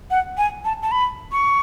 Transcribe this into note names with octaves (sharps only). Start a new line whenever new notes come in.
F#5
G#5
A5
A5
B5
C#6